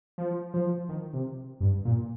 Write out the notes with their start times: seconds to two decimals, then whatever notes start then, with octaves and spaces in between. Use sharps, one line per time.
0.18 F3
0.54 F3
0.89 D#3
1.14 C3
1.60 G2
1.85 A#2